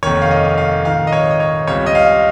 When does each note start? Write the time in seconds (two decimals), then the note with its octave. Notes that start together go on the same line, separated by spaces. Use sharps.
0.03 F1 D#2 D#3 C#5
0.22 F5
0.30 D#5
0.58 F5
0.85 A#1 G#2 D#3 F5
1.07 D#5
1.13 C#5
1.30 D#5
1.40 C#5
1.67 C#2 C#3 G3 C4 C#5
1.86 D#5
1.95 F5